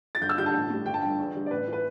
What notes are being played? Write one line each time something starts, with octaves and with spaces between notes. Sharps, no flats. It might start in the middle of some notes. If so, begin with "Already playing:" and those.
A6
G1 G6
E6
G2 D3 G3 G6
A5
A1
A2 G3
G1 G5
A5
G2 D3 G5
E2
D3 G3
D5
A1 B4
E3 B4